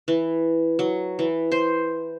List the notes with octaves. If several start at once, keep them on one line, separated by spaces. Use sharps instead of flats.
E3
F#3
E3
C5